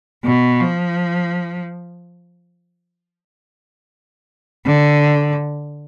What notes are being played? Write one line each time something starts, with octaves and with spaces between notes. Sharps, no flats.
B2
F3
D3